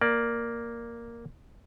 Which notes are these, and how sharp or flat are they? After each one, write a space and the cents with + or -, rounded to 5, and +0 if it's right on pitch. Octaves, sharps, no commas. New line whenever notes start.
A#3 +0 D5 +5